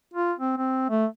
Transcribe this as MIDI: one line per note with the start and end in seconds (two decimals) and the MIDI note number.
0.14 0.33 65
0.38 0.55 60
0.57 0.88 60
0.90 1.06 57